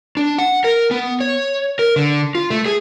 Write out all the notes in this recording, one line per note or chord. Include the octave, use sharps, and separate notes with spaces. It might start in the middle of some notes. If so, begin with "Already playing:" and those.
D4
F#5
A#4
B3
C#5
A#4
D3
F4
A3
G#4